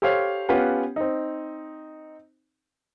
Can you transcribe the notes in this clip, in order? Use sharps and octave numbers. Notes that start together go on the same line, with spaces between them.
G4 A4 C5 C#5 F5
B3 C#4 F4 G4 B4 F#5
C4 D#4